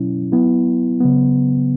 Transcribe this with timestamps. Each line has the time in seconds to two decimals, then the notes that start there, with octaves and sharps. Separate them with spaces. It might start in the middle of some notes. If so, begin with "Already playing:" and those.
Already playing: B2 F#3 C#4 E4
0.32 F#3 B3 E4
1.00 C#3 F#3 B3